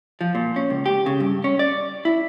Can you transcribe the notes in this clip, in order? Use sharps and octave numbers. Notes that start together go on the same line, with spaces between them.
F3
A#2
C#4
C#2
G4
C#3
G2
C#4
D5
E4